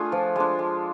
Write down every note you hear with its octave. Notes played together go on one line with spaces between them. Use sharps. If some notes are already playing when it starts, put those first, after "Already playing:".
Already playing: A3 D4 F4 G#4
F3
G#3 D4
G#3